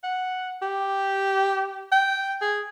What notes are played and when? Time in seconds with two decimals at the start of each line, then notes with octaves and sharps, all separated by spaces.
0.04 F#5
0.62 G4
1.92 G5
2.41 G#4